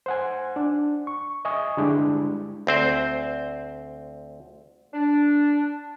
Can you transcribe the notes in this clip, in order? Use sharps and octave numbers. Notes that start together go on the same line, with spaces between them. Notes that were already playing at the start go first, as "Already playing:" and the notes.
C5 F#5 G#5
D4
C#6
D#5 E5 G#5 C#6 D#6
D3 G3 G#3 D4 E4 G4
D2 C4 C5
D4